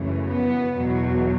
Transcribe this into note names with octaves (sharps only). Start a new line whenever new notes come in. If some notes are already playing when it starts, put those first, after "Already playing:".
Already playing: F#2 C#3 E3 A3
B3
E2 B2 F#3